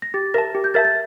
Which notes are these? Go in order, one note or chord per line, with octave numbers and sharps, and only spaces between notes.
A#6
G4 A6
A#4 E5 A5 A#6
G4
G6
A#4 E5 A5 A6
A6